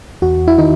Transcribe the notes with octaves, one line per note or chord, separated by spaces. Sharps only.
E2 F#4
E4
D#3 D#4